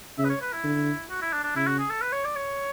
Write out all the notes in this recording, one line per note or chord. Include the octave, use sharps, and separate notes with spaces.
C#3 E5
B4
C#5
B4
E4
D3
F#4
E4
D4
D4
C#3 E4
F#4
G#4
A4
B4
C#5
D5
C#5